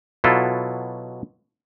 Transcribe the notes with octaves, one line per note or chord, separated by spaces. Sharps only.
B2 F#3 E4 F4 A4